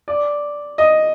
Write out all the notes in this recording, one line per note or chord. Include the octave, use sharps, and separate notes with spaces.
D5
D#5